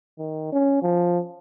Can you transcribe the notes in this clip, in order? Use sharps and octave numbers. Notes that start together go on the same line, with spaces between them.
D#3
C#4
F3